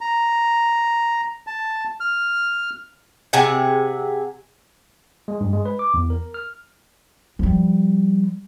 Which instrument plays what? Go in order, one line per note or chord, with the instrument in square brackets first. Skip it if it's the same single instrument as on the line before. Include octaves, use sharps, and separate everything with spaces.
[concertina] A#5
A5
F6
[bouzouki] C3 G#4 F#5
[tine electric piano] G#3
G2
G#3
B4
D6
E2
A#4
F6
[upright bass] F3 G3